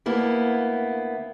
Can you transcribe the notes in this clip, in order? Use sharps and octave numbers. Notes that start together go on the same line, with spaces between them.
D2 A#3 B3 E4